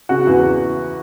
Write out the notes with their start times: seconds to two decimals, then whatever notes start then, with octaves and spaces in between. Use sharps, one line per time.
0.09 C#3 F#4
0.27 E2